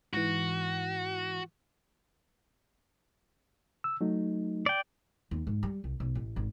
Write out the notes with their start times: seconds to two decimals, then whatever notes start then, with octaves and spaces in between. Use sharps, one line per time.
0.13 G#2 E3 F#4
3.84 E6
4.01 F#3 A3 D#4
4.66 D5 G5
5.31 D#2
5.47 G#2
5.63 G3
5.84 C2
6.00 B1
6.15 A1
6.36 G#1